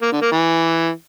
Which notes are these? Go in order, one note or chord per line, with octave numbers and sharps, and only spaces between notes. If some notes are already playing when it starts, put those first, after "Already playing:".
A#3
D3
A#3
E3